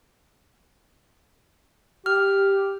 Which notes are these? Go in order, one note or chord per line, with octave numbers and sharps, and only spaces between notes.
G4 F6